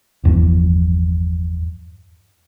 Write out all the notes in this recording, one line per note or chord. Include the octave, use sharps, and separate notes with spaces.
G1 E2 G2 F3